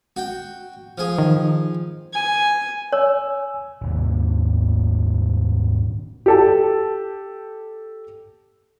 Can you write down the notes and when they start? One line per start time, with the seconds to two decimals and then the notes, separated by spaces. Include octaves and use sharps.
0.16 F#4 G5
0.98 F3 G#4
1.18 D#3
2.13 G#5
2.93 C#5 G#5 E6
3.82 D#1 G#1 D#2
6.26 G4 A4 A5